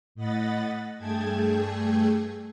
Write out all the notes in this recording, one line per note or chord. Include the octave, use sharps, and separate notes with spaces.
A2 D#5 F#5 B5 A6
G2 A3 G#4 G5 A5 G#6